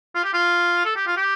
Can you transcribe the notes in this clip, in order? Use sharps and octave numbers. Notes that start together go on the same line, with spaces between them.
F4
G4
F4
A4
G4
F4
G4